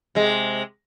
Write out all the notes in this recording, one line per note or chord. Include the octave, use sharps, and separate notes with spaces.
C3 G#3